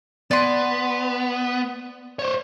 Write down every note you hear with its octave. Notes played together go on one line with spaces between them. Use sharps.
B3 D5 G#5 C6
C5 C#5